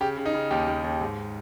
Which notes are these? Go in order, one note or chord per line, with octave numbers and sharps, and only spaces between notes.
C#3 G4
C#3
D#4
C#3
D#2 G4
D#2
D#2
G#2